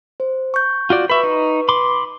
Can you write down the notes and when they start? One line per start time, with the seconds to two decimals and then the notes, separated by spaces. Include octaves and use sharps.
0.20 C5
0.54 C#6 G6
0.90 F4 F#4 D5
1.10 B4 E5 B5 C#6
1.23 D#4
1.69 B5 C6 D6